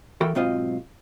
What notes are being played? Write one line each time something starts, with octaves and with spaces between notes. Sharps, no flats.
E3 F#4 A4 A#4 G5
B1 G#2 C4 F4 D#5 F5